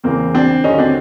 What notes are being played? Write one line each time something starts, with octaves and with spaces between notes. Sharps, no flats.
E2 C#3 E3 A#3 C4
C4 D4
D#2 D3 F#3 C#4 D#4
C4 D4